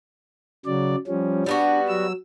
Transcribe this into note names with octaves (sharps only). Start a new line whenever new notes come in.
C#3 F#3 D5
F3 G3 C#4
G3 B3 D4 F#4
F#3 E6